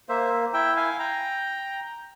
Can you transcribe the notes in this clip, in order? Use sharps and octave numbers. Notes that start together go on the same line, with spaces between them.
A#3 C5 E5
E4 E5 G5
F5 G#5
G5 A#5